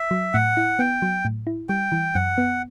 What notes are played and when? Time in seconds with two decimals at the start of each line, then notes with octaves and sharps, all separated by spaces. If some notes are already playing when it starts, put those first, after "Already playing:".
Already playing: E5
0.11 F#3
0.34 A2 F#5
0.57 E4
0.79 B3 G5
1.02 F#3
1.25 A2
1.47 E4
1.69 G3 G5
1.92 E3
2.15 F#2 F#5
2.38 B3